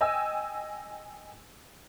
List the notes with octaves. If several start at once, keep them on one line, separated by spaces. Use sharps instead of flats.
D#5 G5 G#5 E6